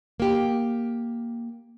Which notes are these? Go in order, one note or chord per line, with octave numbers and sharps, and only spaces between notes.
A#3 G4